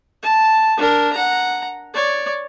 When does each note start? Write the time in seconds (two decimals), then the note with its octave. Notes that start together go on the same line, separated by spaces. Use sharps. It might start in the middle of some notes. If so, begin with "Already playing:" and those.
0.23 A5
0.77 D4 A#4
1.13 F#5 A#5
1.94 C#5 D5